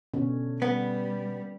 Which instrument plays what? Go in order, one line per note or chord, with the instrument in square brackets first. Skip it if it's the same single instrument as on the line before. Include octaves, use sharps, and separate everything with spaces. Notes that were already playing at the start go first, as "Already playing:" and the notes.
[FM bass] B2 [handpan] D3 C#4
[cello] G3 [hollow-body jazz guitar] B3